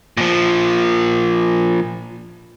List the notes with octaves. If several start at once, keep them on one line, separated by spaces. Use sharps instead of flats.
A#2 F3